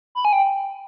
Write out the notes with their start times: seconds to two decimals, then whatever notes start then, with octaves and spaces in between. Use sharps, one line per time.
0.15 B5
0.25 G#5
0.33 G5